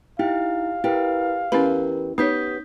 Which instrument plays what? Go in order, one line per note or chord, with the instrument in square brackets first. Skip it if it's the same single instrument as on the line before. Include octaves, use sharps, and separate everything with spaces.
[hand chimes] D#4 E4 [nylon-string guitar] G4 [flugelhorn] F5
[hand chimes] E4 A#4 B4 [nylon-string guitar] G4
[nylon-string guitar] E2 G4 B4 [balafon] C#4 E4 B5 [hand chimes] A#4
[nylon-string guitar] B3 G4 C#5 [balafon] D#4 [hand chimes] D#6 G6 B6